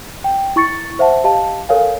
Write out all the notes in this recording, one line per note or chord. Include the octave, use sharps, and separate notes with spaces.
G5
E4 C#6 A6 C#7
C5 E5 F#5 A5
G4 D#5 F5 A5
A4 A#4 C#5 F5 G#5